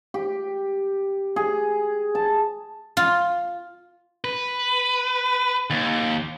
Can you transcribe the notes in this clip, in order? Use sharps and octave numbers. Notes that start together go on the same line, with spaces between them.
G4
G#4
A5
F4
B4
D#2